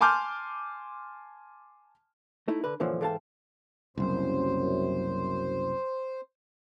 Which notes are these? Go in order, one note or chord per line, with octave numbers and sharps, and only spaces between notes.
G#5 A5 C6 D6 F6 G6
A3 D#4 E4
D3 B4
F#2 A#2 D3 E3 F3
G#2 E3 A4 F5 G5 A5
F#1 C2 F#2 C5